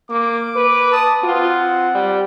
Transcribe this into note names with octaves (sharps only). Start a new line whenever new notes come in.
A#3 D6
B4
A5 D#6
C4 F4 F#5
G3